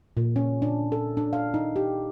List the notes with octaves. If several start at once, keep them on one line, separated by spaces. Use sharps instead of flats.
A#2
C#4
D4
A4
D4
F5
D#4
G4